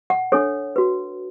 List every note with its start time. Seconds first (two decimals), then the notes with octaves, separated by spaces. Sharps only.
0.10 F#5
0.32 D4 A4 C#5
0.76 F#4 B4